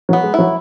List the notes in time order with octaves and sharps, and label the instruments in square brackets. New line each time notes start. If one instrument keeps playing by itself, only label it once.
[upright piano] F#3
[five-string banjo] B3
[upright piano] G#3
[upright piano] F#3 [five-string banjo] E4